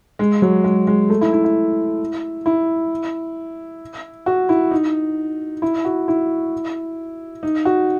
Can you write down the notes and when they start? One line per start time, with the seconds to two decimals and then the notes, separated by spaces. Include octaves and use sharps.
0.19 G#3
0.42 F#3
0.64 G#3
0.87 G#3
1.10 A3
1.21 E4
1.33 E4
1.44 E4
2.46 E4
4.26 F#4
4.49 E4
4.71 D#4
5.62 E4
5.85 F#4
6.08 E4
7.43 D#4
7.65 F#4